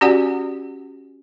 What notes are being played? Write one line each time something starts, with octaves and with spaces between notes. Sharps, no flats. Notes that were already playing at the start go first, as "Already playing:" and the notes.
C#4 F#4 G4 D5 F#5 G#5